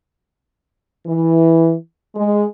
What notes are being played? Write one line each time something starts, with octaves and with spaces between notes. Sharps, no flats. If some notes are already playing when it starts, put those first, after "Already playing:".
E3
G#3